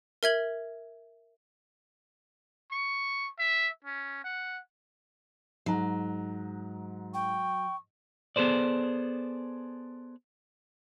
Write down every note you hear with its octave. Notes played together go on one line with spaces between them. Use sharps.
A#4 E5 G#6 F#7
C#6
E5
C#4
F#5
G#2 F#3 A#5
G5 C#6
B3 G#4 A4 C5 D5